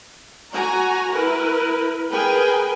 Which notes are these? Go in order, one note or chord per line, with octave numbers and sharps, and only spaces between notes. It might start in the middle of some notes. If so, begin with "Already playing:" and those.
F#4 G#5 A#5
E4 A#4 B4
G#4 A#4 B4 G5 G#5